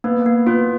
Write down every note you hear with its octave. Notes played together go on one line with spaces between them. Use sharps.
A#3 B3
A#3
B3 F4